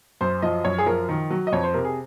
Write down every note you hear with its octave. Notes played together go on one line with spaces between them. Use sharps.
F#2 C5
F3 D#5
F#2 C#5
G#4
F3 A#4
D#3
F#3
D#5
F2 C#5
C5
C3 A#4
G#4